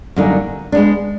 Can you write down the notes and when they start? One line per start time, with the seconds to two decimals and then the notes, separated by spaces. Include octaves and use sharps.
0.16 F#2 D3 G3 A#3 D#4
0.72 G#3 B3 D4